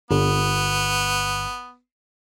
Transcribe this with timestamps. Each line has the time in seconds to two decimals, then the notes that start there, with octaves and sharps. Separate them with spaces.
0.11 G1 B3